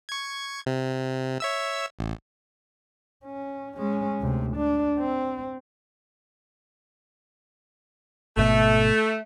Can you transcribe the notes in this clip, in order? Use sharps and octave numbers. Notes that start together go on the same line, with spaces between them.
C#6 G#6
C3
C#5 E5 E6
A1
C#4
G#3 C#4
D2 C3
D4
C4
G#1 B2 A3